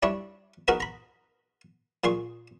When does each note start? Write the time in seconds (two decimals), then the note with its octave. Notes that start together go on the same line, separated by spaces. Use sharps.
0.03 G3 D4 E4 C#5
0.68 B3 D#4 F#4 G#4 A#4 B4
0.80 A#5 B5
2.04 A#2 G#4 C6 C#6